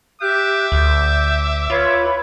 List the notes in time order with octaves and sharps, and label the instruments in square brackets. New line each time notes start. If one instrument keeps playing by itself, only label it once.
[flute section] G4 F#6 G6 [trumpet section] E5 D6
[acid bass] D2 [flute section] G6
[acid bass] F4 [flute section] B4 C#5 B5